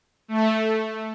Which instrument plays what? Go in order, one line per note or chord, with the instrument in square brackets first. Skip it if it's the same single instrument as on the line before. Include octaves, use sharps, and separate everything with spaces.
[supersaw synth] A3